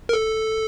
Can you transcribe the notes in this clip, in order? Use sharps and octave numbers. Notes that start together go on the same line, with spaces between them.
A#4
A4